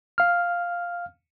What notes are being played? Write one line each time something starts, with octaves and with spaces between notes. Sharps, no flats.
F5 F6